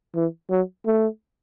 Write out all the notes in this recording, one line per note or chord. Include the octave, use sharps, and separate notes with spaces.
E3
F#3
A3